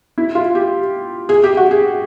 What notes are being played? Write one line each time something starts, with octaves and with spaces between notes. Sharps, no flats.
E4
F4
G4
G#4
G4
F#4
G#4